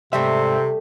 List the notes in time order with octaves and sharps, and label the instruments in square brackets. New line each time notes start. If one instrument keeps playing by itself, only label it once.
[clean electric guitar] G#2 D5 E5 [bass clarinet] C3 [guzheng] G3 A3 D#4 [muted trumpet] C4